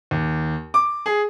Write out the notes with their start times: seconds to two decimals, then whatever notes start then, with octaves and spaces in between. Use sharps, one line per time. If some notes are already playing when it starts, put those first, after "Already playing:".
0.11 D#2
0.74 D6
1.06 G#4